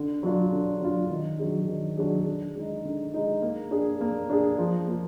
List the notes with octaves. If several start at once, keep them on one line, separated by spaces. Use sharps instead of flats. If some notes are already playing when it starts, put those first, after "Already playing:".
Already playing: D3
F#3 D4 F4
D3
F#3 D4 F4
D#3
F#3 D4 G#4
D#3
F#3 D4 G#4
D3
G#3 D#4
D3
G#3 D#4
A#3
D4 G#4
A#3
D4 G#4
F3
A#3 F4